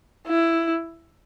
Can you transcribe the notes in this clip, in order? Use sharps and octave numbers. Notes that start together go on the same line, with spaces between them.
E4